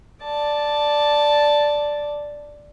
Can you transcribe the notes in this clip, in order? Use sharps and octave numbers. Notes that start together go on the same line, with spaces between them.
D5 A5